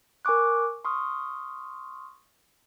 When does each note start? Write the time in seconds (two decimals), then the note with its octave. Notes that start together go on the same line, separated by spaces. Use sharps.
0.25 A#4 G#5 C#6 D6 F#6
0.85 C6 C#6 D#6 F6